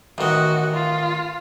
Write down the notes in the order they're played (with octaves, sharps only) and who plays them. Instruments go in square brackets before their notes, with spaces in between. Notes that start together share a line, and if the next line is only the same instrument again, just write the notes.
[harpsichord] A1 D#3 [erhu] F#4
[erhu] F4